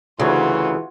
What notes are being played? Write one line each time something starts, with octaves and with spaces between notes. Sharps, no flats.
D2 C#3 E3 F#3 F4 F#4